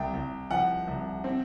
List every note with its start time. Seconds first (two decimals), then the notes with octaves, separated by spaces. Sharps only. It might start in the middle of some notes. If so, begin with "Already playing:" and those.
Already playing: C2 G5
0.14 C2
0.51 F3 F#5
0.87 C2
1.24 C4